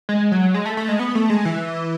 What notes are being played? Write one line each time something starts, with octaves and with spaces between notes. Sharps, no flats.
G#3
F#3
G#3
A3
A3
G#3
B3
A3
G#3
E3